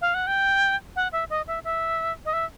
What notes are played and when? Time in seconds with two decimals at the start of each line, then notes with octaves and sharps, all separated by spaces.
0.01 F5
0.14 F#5
0.27 G5
0.96 F#5
1.12 E5
1.30 D#5
1.47 E5
1.64 E5
2.25 D#5
2.33 E5